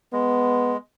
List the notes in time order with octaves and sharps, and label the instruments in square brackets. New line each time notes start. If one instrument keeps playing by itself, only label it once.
[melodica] G#3 [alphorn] B3